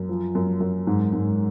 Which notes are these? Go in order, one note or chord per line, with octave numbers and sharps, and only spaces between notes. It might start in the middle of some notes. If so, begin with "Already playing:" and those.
Already playing: F#2
F3
F#2
F#2
G#2
G#2